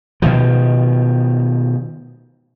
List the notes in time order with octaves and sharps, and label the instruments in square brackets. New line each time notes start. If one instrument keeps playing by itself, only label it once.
[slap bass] B2 D#3 F3